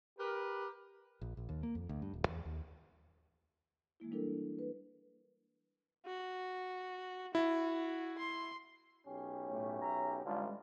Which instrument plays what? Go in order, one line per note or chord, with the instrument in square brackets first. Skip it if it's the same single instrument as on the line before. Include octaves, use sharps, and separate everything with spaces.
[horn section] G4 A#4 B4
[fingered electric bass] A#1
A#1
D#2
A#3
F2
D2
G2
D#1
E2
D#2
[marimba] E3 G#3 A#3 E4
G3 D4 E4 A4 A#4
B4
[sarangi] F#4
[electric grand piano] E4 [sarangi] F#4
[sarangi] C6
[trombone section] B1 C#4 G4
[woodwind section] A2 A3
C#5 E5 A#5
[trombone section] A1 D3 F4 [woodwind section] E3 G3 G#3